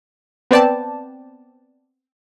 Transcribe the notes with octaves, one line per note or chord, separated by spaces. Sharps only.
B3 C4 B4 D5 G5 A5